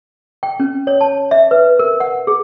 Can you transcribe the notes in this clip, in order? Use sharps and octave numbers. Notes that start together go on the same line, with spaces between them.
G5
C#4
C#5
A5
E5
B4
A#4
F#5
G#4